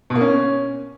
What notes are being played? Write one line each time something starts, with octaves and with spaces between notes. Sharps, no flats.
B2
A#3
C#4